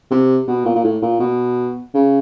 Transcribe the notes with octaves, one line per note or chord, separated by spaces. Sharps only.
C3
B2
A#2
A#2
A2
A#2
B2
C#3